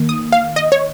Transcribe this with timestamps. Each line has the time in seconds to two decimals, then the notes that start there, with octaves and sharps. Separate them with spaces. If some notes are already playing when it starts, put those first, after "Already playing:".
Already playing: D#3 A#3
0.09 D#6
0.32 F5
0.56 D#5
0.72 C#5